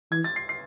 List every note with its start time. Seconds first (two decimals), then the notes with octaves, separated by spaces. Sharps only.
0.12 E3 G#6
0.24 A6
0.36 C7
0.49 C7